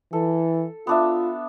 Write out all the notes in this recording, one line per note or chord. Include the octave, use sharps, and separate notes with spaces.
E3 A4
B3 D4 F4 E5